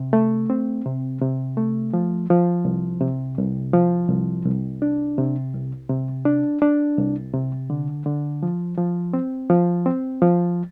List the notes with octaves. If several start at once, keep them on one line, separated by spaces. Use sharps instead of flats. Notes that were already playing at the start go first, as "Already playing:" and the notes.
Already playing: C3
A3
C4
C3
C3
A3
F3
F3
C2
C3
C2
F3
C2
C2
D4
C3
C2
C3
D4
D4
C2
C3
D3
D3
F3
F3
C4
F3
C4
F3